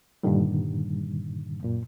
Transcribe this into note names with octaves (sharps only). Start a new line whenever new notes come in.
G2 A#2 D3 D#3 G3
F#2 A#2